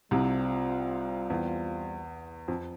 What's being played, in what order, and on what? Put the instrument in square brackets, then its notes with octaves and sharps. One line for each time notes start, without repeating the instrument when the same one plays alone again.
[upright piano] C2 C3 [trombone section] G3 C4 F4
[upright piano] E2
F2